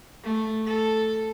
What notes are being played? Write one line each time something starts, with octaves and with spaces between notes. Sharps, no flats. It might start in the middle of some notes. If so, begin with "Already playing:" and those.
A3
A4